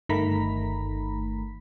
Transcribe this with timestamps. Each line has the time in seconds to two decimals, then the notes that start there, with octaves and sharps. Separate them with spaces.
0.09 G1 D#3 A3 A#5 B5 B6